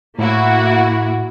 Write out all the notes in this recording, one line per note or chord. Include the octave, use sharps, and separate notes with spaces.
A2 A#3 E4 F#4